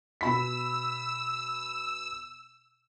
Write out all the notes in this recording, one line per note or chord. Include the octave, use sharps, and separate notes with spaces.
B2 B5 E6 B6